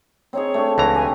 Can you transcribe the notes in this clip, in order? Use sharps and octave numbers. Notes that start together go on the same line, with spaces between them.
C4 D#4 G#4 C#5
A3 D4 G#4
C#2 E3 A#5
G4 G#5